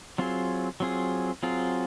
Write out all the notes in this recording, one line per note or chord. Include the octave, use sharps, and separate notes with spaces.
F#3 C4 F4 G#4
F#3 C4 F4 G#4
F#3 C4 F4 G#4